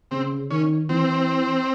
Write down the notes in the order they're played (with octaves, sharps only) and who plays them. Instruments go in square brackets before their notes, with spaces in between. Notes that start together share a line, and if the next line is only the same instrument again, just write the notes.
[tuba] C#3 [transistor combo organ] C4
[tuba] D#3 [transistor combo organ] C#4
[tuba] E3 [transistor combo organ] C4